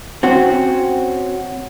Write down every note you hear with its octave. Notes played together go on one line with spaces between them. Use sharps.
C4 C#4 F#4